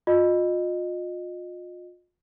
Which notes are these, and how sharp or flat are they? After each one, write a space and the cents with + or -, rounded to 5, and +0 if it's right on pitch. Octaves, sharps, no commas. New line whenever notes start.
F4 +35 D#5 -20